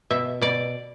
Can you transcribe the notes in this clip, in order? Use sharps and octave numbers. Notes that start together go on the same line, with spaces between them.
B2 E5
B2 D5